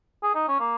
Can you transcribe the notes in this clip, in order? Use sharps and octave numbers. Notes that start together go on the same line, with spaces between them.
G#4
D#4
C#4
A#3